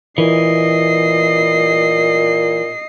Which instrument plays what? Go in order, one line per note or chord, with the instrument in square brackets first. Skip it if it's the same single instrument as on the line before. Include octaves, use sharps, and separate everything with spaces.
[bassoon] A#2 [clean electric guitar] E3 [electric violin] D#5 C7